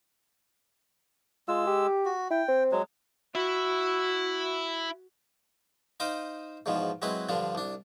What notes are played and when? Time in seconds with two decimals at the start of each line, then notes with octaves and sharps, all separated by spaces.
1.48 G#3 F4 E6
1.67 G4
2.05 F#4
2.31 E4 G5
2.48 C4
2.72 F#3 G#3
3.35 E4 F#4 E5
6.00 D#4 C5 F5 D6 D#6
6.66 E2 G#2 B2 F3
7.02 F#3 G#3 C4 E4 B4
7.29 G2 D3 F3 D4
7.55 C2 D4